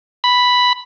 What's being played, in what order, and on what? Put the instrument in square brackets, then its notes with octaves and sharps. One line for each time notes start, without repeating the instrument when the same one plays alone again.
[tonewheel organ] B5